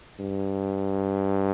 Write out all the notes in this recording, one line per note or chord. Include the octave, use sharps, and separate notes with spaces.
G2